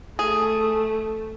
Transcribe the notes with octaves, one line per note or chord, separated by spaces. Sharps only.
A3 G#4